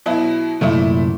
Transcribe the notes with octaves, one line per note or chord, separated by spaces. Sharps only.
B2 F#3 E4
C2 F#2 A#2 A3 E4